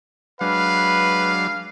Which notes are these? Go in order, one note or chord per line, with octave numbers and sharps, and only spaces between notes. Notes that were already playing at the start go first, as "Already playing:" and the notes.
F#3 G#3 D4 B4 F5